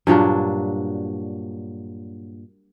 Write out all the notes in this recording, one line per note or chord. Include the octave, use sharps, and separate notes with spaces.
G2 A#2 F#3 D4